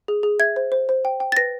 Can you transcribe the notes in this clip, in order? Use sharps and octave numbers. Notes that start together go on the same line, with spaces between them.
G#4
G#4
E5 G#6
C5
C5
C5
G5
G5
A6
B4 A#6